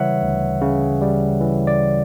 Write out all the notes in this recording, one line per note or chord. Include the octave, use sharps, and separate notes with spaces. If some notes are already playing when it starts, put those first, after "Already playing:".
Already playing: C#3 E3 G3 B4 C#5 E5 F#5
D2
C#3
G3
E3
D5